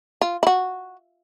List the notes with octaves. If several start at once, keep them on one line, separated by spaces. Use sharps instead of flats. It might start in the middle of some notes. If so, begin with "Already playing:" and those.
F4
E4 F#4